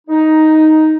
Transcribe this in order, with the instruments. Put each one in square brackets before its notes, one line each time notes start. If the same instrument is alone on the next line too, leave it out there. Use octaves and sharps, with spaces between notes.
[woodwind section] D#4